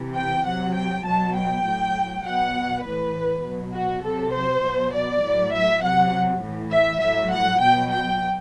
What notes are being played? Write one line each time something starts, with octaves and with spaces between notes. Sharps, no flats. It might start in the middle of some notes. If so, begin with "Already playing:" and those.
Already playing: C3 E3
G5
C3 F#3 F#5
G5
B2 F#3 A5
G5
A2 F#3
B2 F#3 F#5
A2 E3 B4
B2 F#3
F#4
C3 F#3 A4
C5
B2 F#3
D5
A2 F#3
E5
C3 F#3 F#5
A2 E3
E5
A2 F#3 E5
F#5
B2 F#3 G5
G5